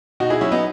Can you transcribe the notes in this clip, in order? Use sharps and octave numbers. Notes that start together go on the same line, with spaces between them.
B2 D#4 F#4
E4 G#4
F#3 C#4 E4
B3 D#4